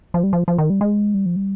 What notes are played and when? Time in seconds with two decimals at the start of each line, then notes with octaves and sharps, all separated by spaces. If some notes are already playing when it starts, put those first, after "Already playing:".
0.14 F3
0.24 G3
0.33 F3
0.48 F3
0.58 D#3
0.70 G3
0.81 G#3
1.14 G3
1.26 F3
1.36 G3